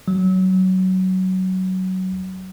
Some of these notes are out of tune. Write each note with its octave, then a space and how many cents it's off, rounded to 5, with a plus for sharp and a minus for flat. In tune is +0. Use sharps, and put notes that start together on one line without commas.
F#3 +15